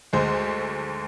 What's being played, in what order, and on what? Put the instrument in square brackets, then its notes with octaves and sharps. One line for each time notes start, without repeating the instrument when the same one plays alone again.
[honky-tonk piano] D2 D3 G#3 C5